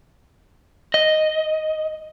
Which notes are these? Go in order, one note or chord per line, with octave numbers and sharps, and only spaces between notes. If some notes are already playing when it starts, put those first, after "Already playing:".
D#5